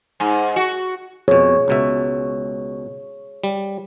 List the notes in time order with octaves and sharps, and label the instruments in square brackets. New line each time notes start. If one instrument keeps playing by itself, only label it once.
[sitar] G#2
F#4
[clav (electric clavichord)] F2 B2 [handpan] G#4 C#5
[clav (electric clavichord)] C#2 B2 E5
G3